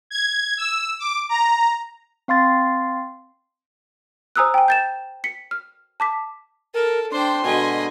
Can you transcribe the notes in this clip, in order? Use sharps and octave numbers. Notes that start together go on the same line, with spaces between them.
G#6
E6
D6
A#5
C4 F5 C6 A6
C5 G#5 A#5 D#6 E6 F#6
G5 G#5
G6 A6 E7
B6 C#7
F6
A5 D6 B6
A4 A#4
D4 C5 G5 C6
B2 D3 G#3 B4 D#5 G#5